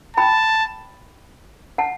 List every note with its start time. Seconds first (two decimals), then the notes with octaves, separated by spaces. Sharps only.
0.17 G5 A5 B5
1.78 F#5 A5